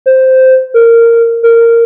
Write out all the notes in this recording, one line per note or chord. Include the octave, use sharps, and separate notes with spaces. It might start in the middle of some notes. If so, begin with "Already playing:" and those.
C5
A#4
A#4